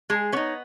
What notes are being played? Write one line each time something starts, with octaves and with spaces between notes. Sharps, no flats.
G#3 G#4
B3 C#4 D#4 C#5